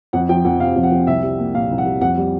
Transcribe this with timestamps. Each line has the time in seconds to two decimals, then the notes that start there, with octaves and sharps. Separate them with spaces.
0.13 F2 F#5
0.29 F3 G5
0.45 F2 F#5
0.60 C3 F5
0.76 F2
0.83 F#5
0.92 F3
1.07 C2 E5
1.23 G3
1.39 A#3
1.54 A#2 F5
1.71 C2
1.78 F#5
1.85 G3
2.01 F2 F#5
2.18 G3